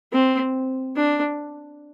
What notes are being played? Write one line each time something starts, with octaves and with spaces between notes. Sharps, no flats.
C4
D4